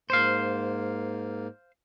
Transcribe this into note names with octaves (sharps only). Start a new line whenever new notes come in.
G#2 A#3 C5 F5